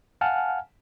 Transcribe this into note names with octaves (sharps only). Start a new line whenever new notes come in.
F5 F#5 G#5 A5 F6